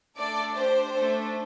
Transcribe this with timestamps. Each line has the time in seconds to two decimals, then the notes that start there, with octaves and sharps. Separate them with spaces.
0.16 A3 D4 A4 D5
0.54 D4 G4 C5
0.93 A3 D4 A4